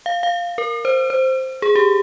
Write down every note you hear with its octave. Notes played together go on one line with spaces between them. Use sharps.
F5
F5
A#4
C5
C5
G#4
G4